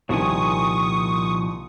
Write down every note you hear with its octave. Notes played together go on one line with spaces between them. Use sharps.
C2 A#2 D#3 F3 G#5 C#6 D#6